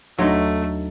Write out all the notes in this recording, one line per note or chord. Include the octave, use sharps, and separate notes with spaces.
D#2 F#3 A3 D4 D#4 C6